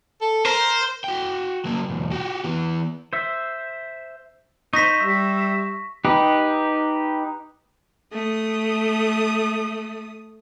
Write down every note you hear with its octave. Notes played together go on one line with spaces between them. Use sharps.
A4
A#4 C5
F#4 G5
F#3 A#3
B1 E2
F#4 G4
E3 B3
C5 E5
D#4 C5 C#6 A#6 B6
G3 E5
D#4 G4 B4
A3 D#6